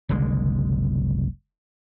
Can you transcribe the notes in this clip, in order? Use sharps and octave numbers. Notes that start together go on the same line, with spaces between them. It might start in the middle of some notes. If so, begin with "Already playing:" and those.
F#1 C2 D3 G#3